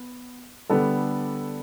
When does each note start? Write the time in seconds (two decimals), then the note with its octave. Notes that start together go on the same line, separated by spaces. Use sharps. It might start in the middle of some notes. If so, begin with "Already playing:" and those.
Already playing: B3
0.70 D3 G3 B3 D4 A4